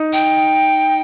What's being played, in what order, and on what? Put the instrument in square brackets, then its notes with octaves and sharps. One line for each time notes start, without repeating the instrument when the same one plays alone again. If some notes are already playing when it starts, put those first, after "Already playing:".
Already playing: [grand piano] D#4
[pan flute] G5